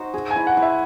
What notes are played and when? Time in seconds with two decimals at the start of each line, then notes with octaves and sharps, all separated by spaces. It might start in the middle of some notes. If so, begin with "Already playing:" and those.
Already playing: D#4 F#4 C5
0.14 G#4
0.31 G#5
0.36 E4
0.47 F#5
0.57 E4
0.62 E5